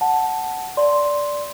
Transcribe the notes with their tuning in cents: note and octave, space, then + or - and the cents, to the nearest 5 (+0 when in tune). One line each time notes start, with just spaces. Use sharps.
F#5 +0 A5 +0
D5 -10 C6 +0